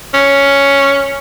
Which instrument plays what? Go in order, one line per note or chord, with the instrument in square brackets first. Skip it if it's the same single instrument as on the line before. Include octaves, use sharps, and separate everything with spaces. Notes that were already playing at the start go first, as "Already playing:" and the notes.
[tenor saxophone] C#4